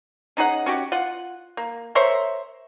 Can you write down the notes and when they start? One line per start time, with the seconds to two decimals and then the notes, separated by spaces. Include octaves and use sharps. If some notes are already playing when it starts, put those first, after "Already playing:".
0.37 C#4 D#4 G#4 F#5
0.66 C#4 F#4 G4
0.92 F4 F#5
1.57 A#3
1.95 A#4 C5 C#5 E5